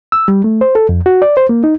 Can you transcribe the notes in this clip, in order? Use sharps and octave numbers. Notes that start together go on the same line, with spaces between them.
E6
G3
A3
C5
A4
F2
F#4
D5
C5
A#3
D#4